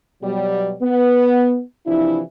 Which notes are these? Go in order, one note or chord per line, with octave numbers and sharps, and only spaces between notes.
B2 F#3 G3
B3
C3 E3 F3 D4 E4